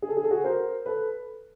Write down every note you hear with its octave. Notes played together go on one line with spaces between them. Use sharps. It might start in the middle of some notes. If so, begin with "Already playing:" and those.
G#4
A4
G#4
A4
F#4 G#4
A#4 C5
A4 B4